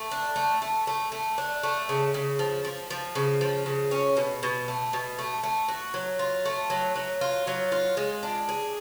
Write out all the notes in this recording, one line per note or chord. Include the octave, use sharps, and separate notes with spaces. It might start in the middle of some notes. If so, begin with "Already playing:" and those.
Already playing: A3
D4
A3
A3
A3
A3
D4
A3
C#3
C#3
F3
F3
F3
C#3
F3
C#3
C#4
B2
B2
A3
B2
A3
A3
F#4
F#3
F4
A3
F#3
F#3
F4
F#3
F4
G#3
D4
G#4